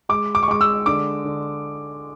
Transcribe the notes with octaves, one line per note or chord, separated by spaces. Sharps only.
G#3 D6
D6
C#6
G#3 D6
E6
D3 D6
D3